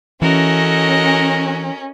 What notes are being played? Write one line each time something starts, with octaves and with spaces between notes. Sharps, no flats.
E3 C#4 F#4 A4 A#4 D#5